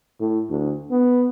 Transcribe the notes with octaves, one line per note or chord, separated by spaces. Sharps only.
A2
D2
B3